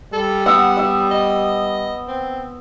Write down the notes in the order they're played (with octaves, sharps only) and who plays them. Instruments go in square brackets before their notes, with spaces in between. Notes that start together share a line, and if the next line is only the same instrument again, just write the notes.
[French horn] G3 [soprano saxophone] A4
[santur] B3 E5 [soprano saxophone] F#5
[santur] E5
[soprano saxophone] D#5
C4